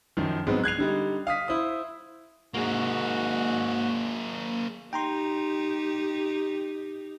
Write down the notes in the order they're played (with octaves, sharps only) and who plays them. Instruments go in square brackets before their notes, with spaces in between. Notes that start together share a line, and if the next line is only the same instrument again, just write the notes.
[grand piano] F#2 D#3 F3
G#2 F#3 G#3 B3 C4 D#4
F#6 G#6 C7 F7
D3 G3 D#4
F5 D#6 B6
E4 C5 D#6
[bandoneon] G#2 F#4 [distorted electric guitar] A#3 G#4
[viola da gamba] D#4 G4 [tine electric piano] G5 A#5 C6